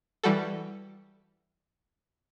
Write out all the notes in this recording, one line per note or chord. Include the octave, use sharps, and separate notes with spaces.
E3 G3 F#4 A4